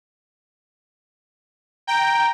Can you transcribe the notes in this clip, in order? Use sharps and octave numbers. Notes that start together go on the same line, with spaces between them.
G5 A#5